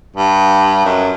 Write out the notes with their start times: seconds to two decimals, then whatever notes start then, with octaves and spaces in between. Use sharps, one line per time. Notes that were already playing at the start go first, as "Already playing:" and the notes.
0.16 G2
0.85 F#2